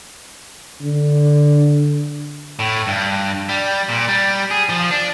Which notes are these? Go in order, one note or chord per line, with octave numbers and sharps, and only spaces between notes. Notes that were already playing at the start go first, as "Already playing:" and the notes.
D3
A2
G2
G3
A#2
G3
G#4
F3
D4